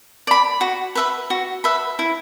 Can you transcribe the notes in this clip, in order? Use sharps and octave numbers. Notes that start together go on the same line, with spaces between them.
D5 B5
F#4
B4 E5 B5
F#4
B4 E5 B5
E4